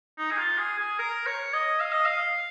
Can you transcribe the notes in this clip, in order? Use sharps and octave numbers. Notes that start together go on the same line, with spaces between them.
D#4
G#4
F4
G#4
G#4
A#4
C#5
D#5
F5
D#5
F5